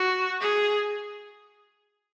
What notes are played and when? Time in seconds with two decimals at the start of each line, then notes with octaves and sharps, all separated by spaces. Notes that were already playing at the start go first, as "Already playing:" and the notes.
Already playing: F#4
0.41 G#4